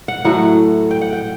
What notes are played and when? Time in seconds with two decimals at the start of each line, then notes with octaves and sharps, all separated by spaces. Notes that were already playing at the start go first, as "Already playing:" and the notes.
0.08 F#5
0.25 A2 F#3 A3 F#5
0.91 G5
1.01 F#5
1.13 G5